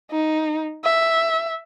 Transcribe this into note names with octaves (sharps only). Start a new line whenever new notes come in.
D#4
E5